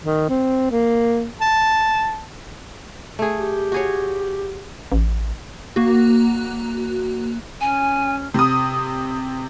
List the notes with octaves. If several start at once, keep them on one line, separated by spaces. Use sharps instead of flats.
D#3
C4
A#3
A5
A3 G#4
G4
F#4 G#4 C#5
A1
A#3 F#4
C#4 G#5
C3 D#6